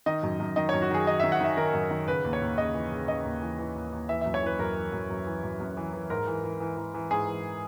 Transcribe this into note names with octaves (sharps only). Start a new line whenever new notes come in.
D#3 D#5
F#2
F#2
D#3 D#5
F#2 C#5
F#4
D#3 G#4
D#3 D#5
D#3 E5
F#5
D#3 E5
D#3 A#4
F#2
D#3
C#3 B4
D#2
C#5
D#2
C#3 D#5
E3
C#3
C#3 D#5
D#2
E3
E3
D#2
D#2
E3 E5
F#2 E5
C#5
E3 B4
F#2 A#4
E3
F#2
F#2
E3
F#2
F#2
E3
E3
G#2 A#4
E3
E3
E3
E3
E3
G#2 G#4
E3